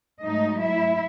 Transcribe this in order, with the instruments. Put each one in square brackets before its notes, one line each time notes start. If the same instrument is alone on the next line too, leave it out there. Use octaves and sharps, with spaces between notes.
[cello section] G#2 F#3 A3 D#4 D#5
E4 E5